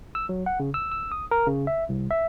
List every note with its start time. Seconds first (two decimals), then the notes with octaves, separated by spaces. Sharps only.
0.15 E6
0.29 F#3
0.46 F#5
0.60 C#3
0.74 E6
0.92 E6
1.12 D#6
1.31 A#4
1.47 C#3
1.67 E5
1.89 C2
2.11 E5